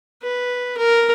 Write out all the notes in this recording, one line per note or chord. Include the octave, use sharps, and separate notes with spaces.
B4
A#4